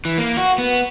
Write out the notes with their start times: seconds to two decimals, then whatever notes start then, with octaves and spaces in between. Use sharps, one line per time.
0.05 E3
0.18 A#3
0.37 F#4
0.58 B3